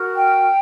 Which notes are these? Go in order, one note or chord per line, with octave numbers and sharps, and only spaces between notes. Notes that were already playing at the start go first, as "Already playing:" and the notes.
Already playing: F#4 A#4
G5